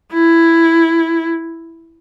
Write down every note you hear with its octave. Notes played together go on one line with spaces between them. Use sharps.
E4